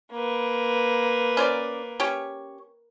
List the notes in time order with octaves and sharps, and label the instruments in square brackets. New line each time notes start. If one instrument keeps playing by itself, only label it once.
[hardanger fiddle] A#3 B4
[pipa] C#4 C5 D5
C#4 G4 C#5